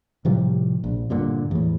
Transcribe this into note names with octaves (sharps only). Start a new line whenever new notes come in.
A2 C3 F3 G3
A#1
G2 A#2 D3
E2 A2